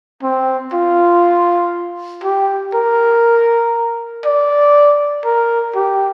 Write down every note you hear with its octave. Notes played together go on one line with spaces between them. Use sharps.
C4
F4
G4
A#4
D5
A#4
G4